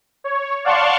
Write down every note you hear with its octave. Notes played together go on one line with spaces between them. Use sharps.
C#5
D5 F5 F#5 A5 C6 C#6